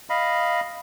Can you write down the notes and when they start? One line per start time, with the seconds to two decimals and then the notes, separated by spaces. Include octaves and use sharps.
0.10 D#5 F5 B5